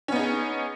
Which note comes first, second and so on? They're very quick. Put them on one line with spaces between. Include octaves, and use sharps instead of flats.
C#4 B3 D#4 G#4